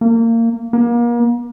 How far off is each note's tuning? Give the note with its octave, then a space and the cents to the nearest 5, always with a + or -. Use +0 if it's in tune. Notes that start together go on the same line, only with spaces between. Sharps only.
A#3 -25
A#3 +35